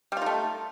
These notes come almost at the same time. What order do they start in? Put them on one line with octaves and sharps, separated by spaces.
G3 F4 D#4 A3